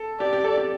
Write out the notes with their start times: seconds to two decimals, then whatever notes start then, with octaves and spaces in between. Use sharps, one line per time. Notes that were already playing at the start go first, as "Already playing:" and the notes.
Already playing: A4
0.20 G4 D5
0.33 G4
0.44 A4
0.58 G4